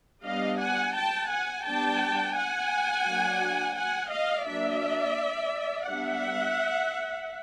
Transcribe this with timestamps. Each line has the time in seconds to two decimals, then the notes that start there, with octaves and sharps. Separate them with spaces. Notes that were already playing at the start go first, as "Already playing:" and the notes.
0.24 G3 B3 D4 D#5 F5
0.60 F#5 G#5
0.94 G5 A5
1.29 F#5 G#5
1.65 G3 B3 D4 G5 A5
2.35 F#5 G#5
3.06 F#3 A#3 D4
3.76 F#5 G#5
4.11 D#5 F5
4.46 F#3 A#3 D4 D5 E5
5.88 G3 B3 D4 E5 F#5